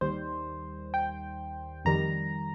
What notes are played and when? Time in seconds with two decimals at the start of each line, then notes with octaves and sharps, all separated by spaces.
0.01 D#2 D#3 G3 C5
0.94 G5
1.85 F2 D#3 G3 A#5